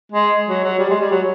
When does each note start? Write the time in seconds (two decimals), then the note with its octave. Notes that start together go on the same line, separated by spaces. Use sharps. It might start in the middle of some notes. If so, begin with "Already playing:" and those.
0.12 G#3
0.49 F#3
0.64 F#3
0.79 G3
0.90 G#3
1.01 G3
1.11 F#3